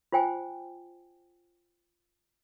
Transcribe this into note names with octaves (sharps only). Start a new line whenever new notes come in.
F4 C5 G5 G#5